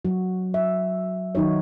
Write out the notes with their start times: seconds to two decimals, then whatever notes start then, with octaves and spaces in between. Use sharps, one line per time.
0.05 F#3 F#4
0.54 E5
1.35 D#3 F#3 D#4 F#4 C#5